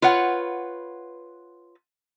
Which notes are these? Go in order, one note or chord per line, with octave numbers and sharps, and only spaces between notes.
F4 B4 C#5 F#5